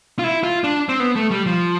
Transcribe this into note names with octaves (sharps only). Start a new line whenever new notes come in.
F4
E4
F4
D4
C4
B3
A3
G3
F3